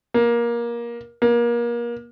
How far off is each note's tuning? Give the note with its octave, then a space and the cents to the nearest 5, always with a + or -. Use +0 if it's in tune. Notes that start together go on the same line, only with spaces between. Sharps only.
A#3 +20
A#3 +30